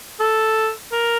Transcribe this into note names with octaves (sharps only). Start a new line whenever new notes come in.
A4
A#4